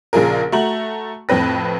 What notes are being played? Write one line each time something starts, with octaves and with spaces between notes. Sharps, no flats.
A#1 C#3 F3 F4 G#4 A#4
A3 F#4 A#5 F#7
F2 A2 C4 B4 A#6